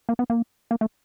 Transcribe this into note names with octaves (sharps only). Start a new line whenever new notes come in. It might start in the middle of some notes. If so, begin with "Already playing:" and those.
A#3
B3
A#3
A#3
A3